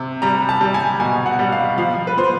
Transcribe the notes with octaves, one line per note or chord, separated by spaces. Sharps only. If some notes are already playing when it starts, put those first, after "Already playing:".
Already playing: C3
G3 A#5
A5
G3
G#5
B2 G#5
F#5
G3
F5
F3 F5
B4
F3 C5